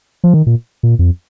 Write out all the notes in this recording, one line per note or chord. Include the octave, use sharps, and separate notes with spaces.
F3
D#3
A#2
A#2
F2